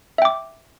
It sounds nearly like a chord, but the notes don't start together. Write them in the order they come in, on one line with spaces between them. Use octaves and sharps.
E5 G5 D6